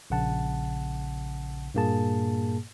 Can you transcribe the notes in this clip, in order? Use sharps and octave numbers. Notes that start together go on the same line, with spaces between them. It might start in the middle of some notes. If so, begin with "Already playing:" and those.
A#1 C#3 F#5 A5
G2 A#2 A#3 G#4 A5